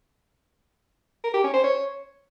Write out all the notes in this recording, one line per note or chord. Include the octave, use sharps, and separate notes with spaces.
A#4
G4
C#4
C5
C#5